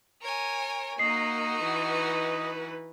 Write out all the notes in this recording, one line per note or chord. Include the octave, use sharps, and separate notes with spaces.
A#4 C#5 G#5
A#3 D#4 F#4 A#4 D#5 C7
E3 B4